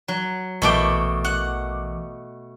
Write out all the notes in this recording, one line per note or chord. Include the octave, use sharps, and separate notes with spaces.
F#3
A#1 B2 E3 A3 G5 D6
F#5